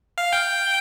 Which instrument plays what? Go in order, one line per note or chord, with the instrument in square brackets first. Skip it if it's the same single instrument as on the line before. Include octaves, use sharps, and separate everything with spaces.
[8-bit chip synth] F5
G5